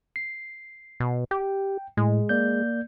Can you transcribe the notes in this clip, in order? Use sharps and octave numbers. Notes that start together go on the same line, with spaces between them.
C7
B2
G4 G5
A2 G#3
A#3 D5 G6